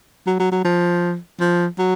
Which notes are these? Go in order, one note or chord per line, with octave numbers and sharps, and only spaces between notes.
F#3
F#3
F#3
F3
F3
F#3